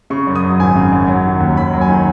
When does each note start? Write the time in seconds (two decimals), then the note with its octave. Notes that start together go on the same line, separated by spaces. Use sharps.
0.10 C#3 C#6
0.27 F#2
0.35 D#6
0.44 F#3
0.59 G#1 G#5
0.76 C#3
0.92 F#2
1.08 F#3
1.25 D#3
1.40 D#2
1.57 D#2 B5
1.73 F#3
1.81 G#5
1.88 D#3